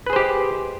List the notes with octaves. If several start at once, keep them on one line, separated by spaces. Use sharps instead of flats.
G4 G#4 B4 C5 D#5